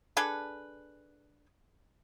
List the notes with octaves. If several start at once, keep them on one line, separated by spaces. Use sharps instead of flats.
D4 G#4 A4 B4